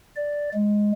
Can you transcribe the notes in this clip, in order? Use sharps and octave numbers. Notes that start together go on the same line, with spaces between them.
D5
G#3